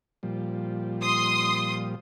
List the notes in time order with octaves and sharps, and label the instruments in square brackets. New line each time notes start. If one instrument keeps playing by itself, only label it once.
[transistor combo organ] A#2 F3 G3
[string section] C6 D#6